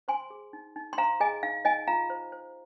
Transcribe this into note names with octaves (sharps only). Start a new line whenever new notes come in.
C5 G#5 C6
G#4
D#4
D#4
C6
C5 F5 A#5
G#4 D#5 G#5
D#4 F5
D#4 D#5 G#5
F4 F5 A#5
C5
C5